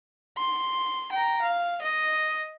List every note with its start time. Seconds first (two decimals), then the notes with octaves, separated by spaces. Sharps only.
0.38 C6
1.12 G5 A#5
1.41 F5
1.81 D#5